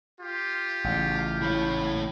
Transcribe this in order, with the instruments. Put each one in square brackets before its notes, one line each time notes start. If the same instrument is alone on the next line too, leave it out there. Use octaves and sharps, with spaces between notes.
[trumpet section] F4 G4
[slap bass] A1 C#3
[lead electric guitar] A3 C#5 [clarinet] E4